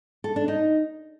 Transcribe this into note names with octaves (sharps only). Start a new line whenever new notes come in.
A4
D4
D#4